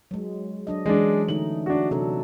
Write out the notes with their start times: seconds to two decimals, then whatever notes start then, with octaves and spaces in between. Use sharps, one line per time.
0.11 F#3 G#3
0.67 F#3 D4 D#5
0.86 E3 G#3 C#4 D4
1.28 D3 A3 D#4 F#7
1.66 D4 F#4
1.91 C3 F#3 D4 A4